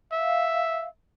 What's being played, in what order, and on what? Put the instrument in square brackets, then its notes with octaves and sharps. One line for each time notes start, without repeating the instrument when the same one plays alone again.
[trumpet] E5 [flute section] F5